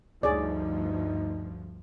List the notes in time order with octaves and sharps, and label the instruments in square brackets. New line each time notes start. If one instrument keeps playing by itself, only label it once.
[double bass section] D2 G2 F3 [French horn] D#4 [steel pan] G#4 C#5 D5